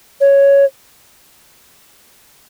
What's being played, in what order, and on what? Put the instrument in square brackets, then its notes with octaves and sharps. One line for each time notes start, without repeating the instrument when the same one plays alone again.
[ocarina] C#5